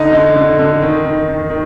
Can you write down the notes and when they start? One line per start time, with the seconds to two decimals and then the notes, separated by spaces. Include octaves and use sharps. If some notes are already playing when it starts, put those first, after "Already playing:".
Already playing: D3 D#4
0.12 D3
0.35 D3
0.59 D3
0.82 D#3
1.05 D#3
1.28 D#3
1.50 D#3